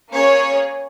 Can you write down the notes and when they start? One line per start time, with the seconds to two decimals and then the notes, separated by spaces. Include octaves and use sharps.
0.12 A#3 C#4 G#4 C#5